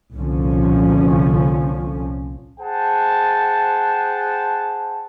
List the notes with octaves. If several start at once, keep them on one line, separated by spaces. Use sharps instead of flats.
C2 A#2 D3 F3 C#4
G#4 C5 F#5 G5 A5